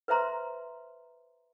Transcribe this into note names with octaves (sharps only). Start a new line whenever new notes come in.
B4 C5 E5 A#5 C6